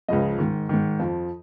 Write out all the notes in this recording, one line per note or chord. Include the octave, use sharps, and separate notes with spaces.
C#2 C#3 F3 D#5
G#2 D#3
G#2 D#3
F2 F3